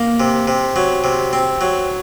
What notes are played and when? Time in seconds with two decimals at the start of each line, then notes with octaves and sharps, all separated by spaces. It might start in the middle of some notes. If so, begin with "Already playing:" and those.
Already playing: A#3
0.20 C3
0.48 C3
0.76 F#3
1.04 C3
1.33 C4
1.61 F#3